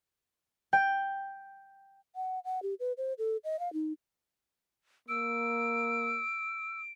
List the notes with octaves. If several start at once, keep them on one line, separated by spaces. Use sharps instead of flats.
G5
F#5
F#5
G4
B4
C5
A4
D#5
F5
D#4
A#3 E6 D7